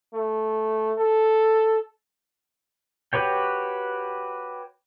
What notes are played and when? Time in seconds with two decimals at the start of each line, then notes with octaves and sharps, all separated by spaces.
0.14 A3
0.98 A4
3.13 F#4 G4 B4 C#5 G5